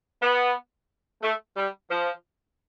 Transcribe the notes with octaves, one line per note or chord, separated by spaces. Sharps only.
B3
A3
G3
F3